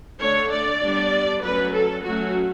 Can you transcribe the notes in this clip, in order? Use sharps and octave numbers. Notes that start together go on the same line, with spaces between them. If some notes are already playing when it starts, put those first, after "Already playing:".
D3 A3 D4 C#5
D5
G3 B3 D4
F#3 A3 C#4 B4
A4
F#3 A3 C#4 F#4